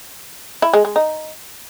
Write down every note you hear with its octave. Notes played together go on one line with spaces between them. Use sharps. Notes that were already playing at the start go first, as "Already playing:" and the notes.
E4
G#3
G#3
D#4